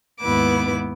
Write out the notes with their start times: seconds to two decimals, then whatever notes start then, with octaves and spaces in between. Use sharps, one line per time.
0.20 D#2 G#2 B3 E4 B4 D6